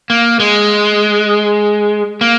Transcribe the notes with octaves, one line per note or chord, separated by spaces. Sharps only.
A#3
G#3
A#3